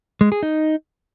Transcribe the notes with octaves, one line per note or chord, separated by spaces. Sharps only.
G#3
G#4
D#4